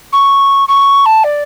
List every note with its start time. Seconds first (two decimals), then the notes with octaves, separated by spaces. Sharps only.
0.12 C#6
0.68 C#6
1.05 A5
1.24 D5